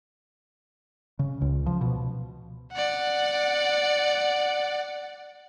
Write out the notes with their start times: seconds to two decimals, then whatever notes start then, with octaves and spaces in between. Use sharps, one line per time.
1.19 C#3
1.41 C#2
1.66 F3
1.81 B2
2.72 D5 F#5